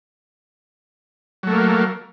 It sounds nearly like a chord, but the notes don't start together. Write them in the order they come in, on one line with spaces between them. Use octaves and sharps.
F#3 A3 A#3